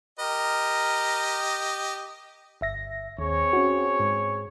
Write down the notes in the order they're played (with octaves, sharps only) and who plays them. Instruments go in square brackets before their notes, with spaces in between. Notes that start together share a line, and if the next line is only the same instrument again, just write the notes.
[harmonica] G4 D#5 [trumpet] A#4
[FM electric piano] G1 E5 A#6
[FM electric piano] D#2 [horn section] C4 G#4 C#5
[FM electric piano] C#4 F#4
G#2